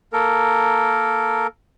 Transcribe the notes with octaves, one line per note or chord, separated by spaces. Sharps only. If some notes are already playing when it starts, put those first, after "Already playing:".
A#3 A4 A#4